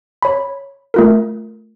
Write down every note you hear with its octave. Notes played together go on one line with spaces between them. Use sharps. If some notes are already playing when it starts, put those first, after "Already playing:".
C#5 B5
A3 F4 A#4